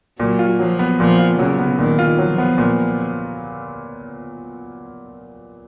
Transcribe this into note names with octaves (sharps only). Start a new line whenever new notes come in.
A#2 F#3
F4
F3 F#3
B3
A#2 F3
F4
C#3 F#3
B3
A#2 D#3
F4
F3 F#3
B3
A#2